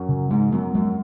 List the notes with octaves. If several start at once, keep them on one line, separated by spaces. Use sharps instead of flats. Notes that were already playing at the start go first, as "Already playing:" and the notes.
Already playing: F#2
C#3
G#2 G#3
F#2 B3
F#2 G#3